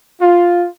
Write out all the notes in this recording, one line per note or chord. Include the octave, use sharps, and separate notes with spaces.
F4